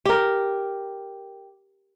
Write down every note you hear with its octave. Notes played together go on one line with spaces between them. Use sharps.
G4 A#4